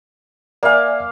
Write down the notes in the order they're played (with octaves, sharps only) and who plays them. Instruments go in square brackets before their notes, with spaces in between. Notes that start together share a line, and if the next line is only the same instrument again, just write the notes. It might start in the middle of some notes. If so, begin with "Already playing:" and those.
[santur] A#3 F5 [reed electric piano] D5 E5 G#5